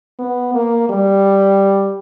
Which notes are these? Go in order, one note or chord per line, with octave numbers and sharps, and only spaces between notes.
B3
A#3
G3